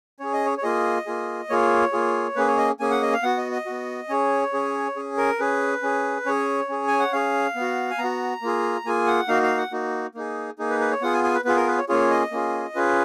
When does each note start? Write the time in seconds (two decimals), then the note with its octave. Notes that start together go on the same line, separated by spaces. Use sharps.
0.20 C#4 G#4 C#5
0.33 D#5
0.46 C#5
0.57 C#5
0.63 A#3 F4 G#4 D#5
1.06 A#3 F4 G#4
1.50 A#3 F4 G#4 C#5
1.93 A#3 F4 G#4
2.36 A#3 C#4 G#4 B4
2.47 C#5
2.58 D#5
2.80 A#3 C#4 G#4 G#5
2.91 F#5
3.02 D#5
3.13 F5
3.23 B3 F#4 F#5
3.37 D#5
3.52 D#5
3.66 B3 F#4
4.09 C#4 G#4 C#5
4.53 C#4 G#4
4.96 C#4 G#4
5.17 A#4
5.39 C#4 G#4 B4
5.83 C#4 G#4
6.26 C#4 G#4 C#5
6.69 C#4 G#4
6.88 G#5
6.99 F#5
7.13 C#4 G#4 F5
7.55 B3
7.61 F#4
7.90 G#5
7.99 B3 A#5
8.04 F#4
8.42 A#3 F4 G#4
8.85 A#3 F4 G#4 G#5
9.07 F#5
9.28 A#3 D#4 F#4 F5
9.43 F5
9.57 F#5
9.72 A#3 D#4 F#4
10.15 A#3 D#4 G#4
10.59 A#3 D#4 G#4
10.70 B4
10.80 B4
10.91 C#5
11.01 B3 F4 G#4 F#5
11.13 G#5
11.24 G#5
11.34 B4
11.45 B3 F4 G#4 B4
11.56 A#4
11.67 B4
11.78 C#5
11.89 A#3 C#4 F4 G#4 C#5
12.11 D#5
12.31 A#3 C#4 F4 G#4
12.75 C#4 F4 G#4 B4